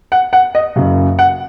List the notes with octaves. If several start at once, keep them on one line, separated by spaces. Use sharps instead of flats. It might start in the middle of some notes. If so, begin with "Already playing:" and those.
F#5
F#5
D#5
F#1 F#2 C#3
F#5